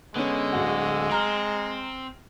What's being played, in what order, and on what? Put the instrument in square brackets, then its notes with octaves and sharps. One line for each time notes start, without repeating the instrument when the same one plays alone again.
[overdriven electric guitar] D3 [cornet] G#3 [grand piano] B3 C#4
[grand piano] D1 F#4
[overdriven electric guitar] C4 [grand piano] A#5 F6